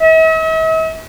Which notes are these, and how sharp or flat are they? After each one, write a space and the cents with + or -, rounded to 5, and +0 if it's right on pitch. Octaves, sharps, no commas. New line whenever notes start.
E5 -45